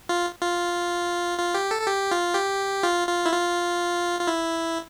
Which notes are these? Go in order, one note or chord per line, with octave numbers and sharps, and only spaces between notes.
F4
F4
F4
G4
A4
A4
G4
F4
G4
F4
F4
E4
F4
F4
E4